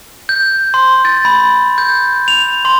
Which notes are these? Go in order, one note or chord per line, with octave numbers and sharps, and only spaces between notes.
G6
C6
A6
B5
G6
F7
C6